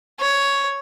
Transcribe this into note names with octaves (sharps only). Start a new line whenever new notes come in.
C#5